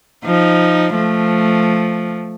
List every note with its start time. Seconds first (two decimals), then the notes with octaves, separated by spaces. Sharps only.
0.25 F3 D#4
0.94 F3 A3